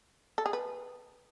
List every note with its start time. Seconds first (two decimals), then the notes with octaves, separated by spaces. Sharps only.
0.38 A4
0.46 G#4
0.53 B4